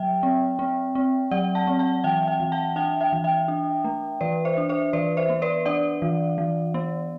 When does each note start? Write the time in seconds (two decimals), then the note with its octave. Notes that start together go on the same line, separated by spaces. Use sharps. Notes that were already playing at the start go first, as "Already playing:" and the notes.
Already playing: F#3 E5 G5
0.23 C4
0.59 C4
0.95 C4
1.31 F#3 D5 F#5
1.55 F#5 A5
1.67 C4
1.79 F#5 A5
2.04 E3 E5 G5
2.28 E5 G5
2.40 E3
2.52 F#5 A5
2.76 D4 E5 G5
3.00 E5 G5
3.13 E3
3.24 E5 G5
3.48 D4
3.85 A3
4.21 E3 B4 D5
4.45 C5 E5
4.58 D4
4.69 C5 E5
4.93 E3 B4 D5
5.17 C5 E5
5.29 B3
5.42 B4 D5
5.65 D4 D5 F#5
6.02 E3
6.38 E3
6.74 B3